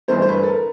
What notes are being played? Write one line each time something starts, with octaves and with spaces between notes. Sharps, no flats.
G1 G2 E3 A3 C5
C5
B4
A4
A#4